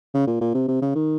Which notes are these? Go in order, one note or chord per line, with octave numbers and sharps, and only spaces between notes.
C#3
A#2
A#2
C3
C3
C#3
D#3